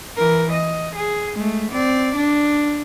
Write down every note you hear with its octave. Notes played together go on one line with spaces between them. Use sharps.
E3 A#4
D#5
G#4
G#3 A3
C4 D5
D4